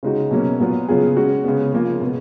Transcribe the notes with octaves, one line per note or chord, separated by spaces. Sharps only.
C#3 G#3 D#4 F#4
B2 F#3 A#3 C#4
A#2 F#3 B3 F4
C#3 F#3 B3 F4 G#4
G#3 C#4 F#4
C#3 G#3 B3
C#3 F3 A#3 F4
B2 G#3 B3